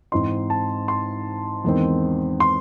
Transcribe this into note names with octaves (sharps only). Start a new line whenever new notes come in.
G#2 E3 C4 D#4 C6
A5
C6
E2 D#3 G#3 C4
C6